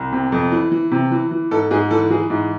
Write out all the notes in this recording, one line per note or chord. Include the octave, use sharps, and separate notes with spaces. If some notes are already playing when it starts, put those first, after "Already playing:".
Already playing: C2
C3
F2
E3
E3
C3
E3
E3
G#2 A4
G#2 G#4
E3 A4
E3 G#4
G#2